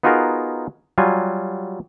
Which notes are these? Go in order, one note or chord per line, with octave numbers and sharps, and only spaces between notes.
B3 D#4 F4 F#4 G#4 A#4
F#3 G3 F4 G#5